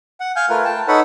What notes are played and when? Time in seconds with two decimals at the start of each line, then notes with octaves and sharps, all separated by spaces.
0.20 F#5
0.36 F5 G#5 F6 G6
0.50 A3 F4 A#4 B4
0.64 G5 A5
0.88 D#4 A4 B4 C#5 F#5 B5